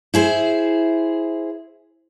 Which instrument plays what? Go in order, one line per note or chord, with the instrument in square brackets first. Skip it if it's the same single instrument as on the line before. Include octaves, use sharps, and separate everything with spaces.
[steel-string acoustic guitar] E4 G#4 C5